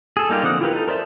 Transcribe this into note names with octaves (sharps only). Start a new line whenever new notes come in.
G#4 A4
G3 A#3 D#4 F4 G4
D3 F3 C4 F#5 D#6
E4 F4 G4 A#4 B4
D#4 A4
A#4 C5 D5 E5 A5